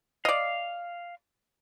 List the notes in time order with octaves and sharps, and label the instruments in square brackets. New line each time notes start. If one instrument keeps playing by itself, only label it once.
[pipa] D5 D#5 [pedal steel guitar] F5